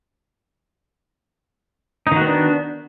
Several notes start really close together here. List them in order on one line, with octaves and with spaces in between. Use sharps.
D#4 D#3 F#4 B3 D4